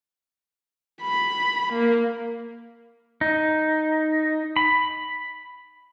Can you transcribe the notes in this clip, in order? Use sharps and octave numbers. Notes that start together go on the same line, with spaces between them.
B5
A#3
D#4
B5